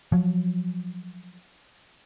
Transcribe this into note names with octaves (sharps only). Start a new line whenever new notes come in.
F3 F#3